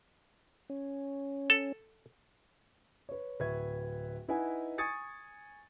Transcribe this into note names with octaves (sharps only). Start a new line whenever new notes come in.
C#4
A4
B4 C#5
D1 B4 E5 C#6 G#6
D#4 E4 B4 D#5 F#5 G#5
G#5 C#6 D#6 G#6 A6 C#7